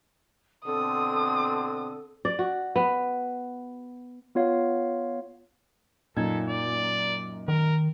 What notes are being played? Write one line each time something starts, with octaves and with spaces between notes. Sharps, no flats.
B2 D3 C4 A4 D#6
D5
F#4
B3
B3 F4 C#5 F5
F#2 A#2 D#4 A4 G#6
D5
D#3 A#4